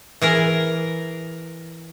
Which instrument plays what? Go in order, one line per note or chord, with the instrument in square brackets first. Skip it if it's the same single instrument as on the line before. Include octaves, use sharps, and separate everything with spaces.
[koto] E3 G#4 A#4